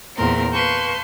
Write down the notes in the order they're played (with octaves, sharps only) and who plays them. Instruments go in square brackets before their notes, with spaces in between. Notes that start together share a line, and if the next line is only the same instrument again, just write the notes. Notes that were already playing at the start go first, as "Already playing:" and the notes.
[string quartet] E2 A#2 C4 A#4
B4 F5 A5 C6 C#6 G6